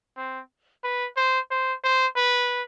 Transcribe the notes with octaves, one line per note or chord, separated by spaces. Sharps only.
C4
B4
C5
C5
C5
B4